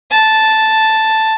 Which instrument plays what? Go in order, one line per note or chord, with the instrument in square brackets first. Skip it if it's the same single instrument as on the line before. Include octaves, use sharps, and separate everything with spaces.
[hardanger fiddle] A5